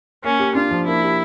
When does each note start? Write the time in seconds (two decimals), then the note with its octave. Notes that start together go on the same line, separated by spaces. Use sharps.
0.24 A#3 C#4
0.40 G4
0.55 D4 F4
0.71 F3
0.86 A#3 E4
1.03 G4